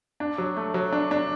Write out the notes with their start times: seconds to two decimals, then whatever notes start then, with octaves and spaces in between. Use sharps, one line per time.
0.20 D4
0.38 F#3
0.56 A3
0.74 F#3
0.92 D4
1.11 D4